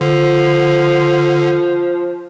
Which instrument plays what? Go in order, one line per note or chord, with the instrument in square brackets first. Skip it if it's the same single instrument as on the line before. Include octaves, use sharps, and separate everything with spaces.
[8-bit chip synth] D3 [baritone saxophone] F3